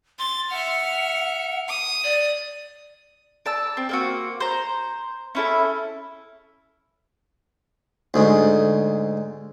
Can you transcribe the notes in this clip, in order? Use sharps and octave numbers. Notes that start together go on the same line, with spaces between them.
C6 A6
E5 F#5 F6
D#6
D5
D5 A5 E6
C4
A#3 C4 F#4
C5 A#5
C#4 E4 A4
D2 G#2